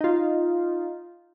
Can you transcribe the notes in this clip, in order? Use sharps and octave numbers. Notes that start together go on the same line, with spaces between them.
D#4 F4